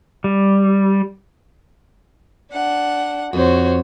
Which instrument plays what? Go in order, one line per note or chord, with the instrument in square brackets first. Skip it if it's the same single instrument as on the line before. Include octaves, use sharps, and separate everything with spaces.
[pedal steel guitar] G3
[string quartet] D4 F#5
[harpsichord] F2 [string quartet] F#4 C5 C#5